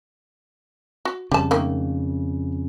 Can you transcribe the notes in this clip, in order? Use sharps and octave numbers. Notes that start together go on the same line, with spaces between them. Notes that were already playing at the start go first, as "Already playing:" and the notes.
F#4
F2 C#3 G3 A5
D#3 A3 A#3